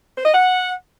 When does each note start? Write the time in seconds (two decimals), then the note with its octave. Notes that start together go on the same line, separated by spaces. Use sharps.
0.16 C5
0.25 D#5
0.34 F#5